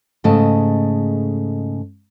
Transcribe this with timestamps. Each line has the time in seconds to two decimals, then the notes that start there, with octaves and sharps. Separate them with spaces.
0.24 G#2 C#3 A3 D#5 A5